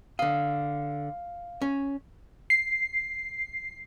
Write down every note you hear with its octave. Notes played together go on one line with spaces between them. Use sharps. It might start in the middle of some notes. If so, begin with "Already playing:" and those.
D3 D#5 F5
C#4
C7